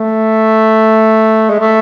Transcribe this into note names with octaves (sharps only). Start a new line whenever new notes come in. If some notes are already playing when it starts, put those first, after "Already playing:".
Already playing: A3
G#3
A3